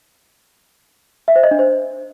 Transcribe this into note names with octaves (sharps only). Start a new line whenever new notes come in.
E5
C5
D#5
D4
C5